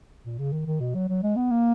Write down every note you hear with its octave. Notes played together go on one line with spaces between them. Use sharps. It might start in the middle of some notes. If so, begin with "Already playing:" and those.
A#2
C#3
D#3
D#3
B2
F#3
F#3
G#3
B3
A#3